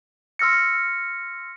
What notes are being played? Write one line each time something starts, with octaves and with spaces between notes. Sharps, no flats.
C6 E6 F6 A#6 C#7